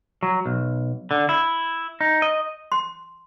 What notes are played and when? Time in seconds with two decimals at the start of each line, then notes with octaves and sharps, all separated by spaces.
0.23 F#3
0.46 B1
1.11 D3
1.29 E4
2.01 D#4
2.22 D#5
2.72 C6